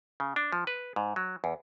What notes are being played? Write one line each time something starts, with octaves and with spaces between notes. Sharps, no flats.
C#3
D4
F3
B4
G#2
F#3
E2